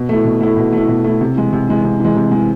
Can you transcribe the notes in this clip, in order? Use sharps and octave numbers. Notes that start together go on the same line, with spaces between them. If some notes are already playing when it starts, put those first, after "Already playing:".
Already playing: B2
A3 E4
B2
A3 E4
B2
A3 E4
B2
A3 E4
C3
E3 G#3
C3
E3 G#3
C3
E3 G#3
C3
E3 G#3